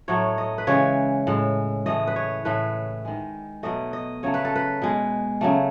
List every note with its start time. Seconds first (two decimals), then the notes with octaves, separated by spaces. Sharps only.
0.08 A2 F#3 A3 C#5
0.38 D#5
0.58 B4
0.67 C#3 E3 G#3 C#5
1.27 A2 G#3
1.86 A2 E3 A3 D#5
2.07 B4
2.16 C#5
2.45 A2 E3 A3 B4
3.05 D#3 G#3
3.63 B2 F#3 A3 D#5
3.93 D#5
4.23 C#3 F#3 A3 C#5
4.34 B4
4.45 A4
4.56 B4
4.82 B2 G#3
5.41 C#3 F#3 A3